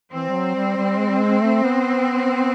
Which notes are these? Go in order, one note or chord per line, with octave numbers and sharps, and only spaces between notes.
E3 C4
G3
F#3
G3
G3
G#3
G3
G#3
A3
B3